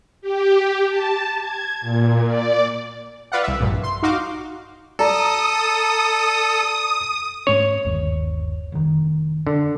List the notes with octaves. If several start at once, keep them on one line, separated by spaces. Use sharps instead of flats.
G4
A5
G#6
A#2
D5
F4 B4 D5 F5 F#5
C2 E5
A#1 G2 A#2
C6
D#4 F#4 F5 C6 D6
A4 D5 A5 A#5 D#6
G#2 A3 C#4 C#5
G1 D#2
F1 D#3
D3